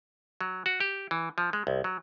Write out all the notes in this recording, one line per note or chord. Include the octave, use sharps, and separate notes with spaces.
F#3
F#4
G4
E3
F3
G#3
C2
F#3